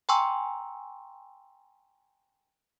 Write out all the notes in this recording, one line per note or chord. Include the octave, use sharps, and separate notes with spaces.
G5 G#5 A#5 C6 C#6 E6